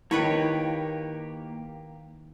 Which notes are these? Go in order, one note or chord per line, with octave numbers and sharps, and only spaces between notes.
D#3 A#3 E4 G4 B4 C#5